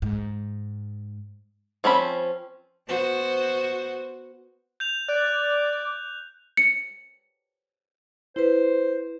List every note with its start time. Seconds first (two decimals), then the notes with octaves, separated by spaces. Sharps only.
0.02 G#2
1.84 F3 C4 C#4 B5
2.88 B3 F#4 C5
4.80 G6 F7
5.08 D5 F#6
6.57 C#7
8.36 E4 B4 C5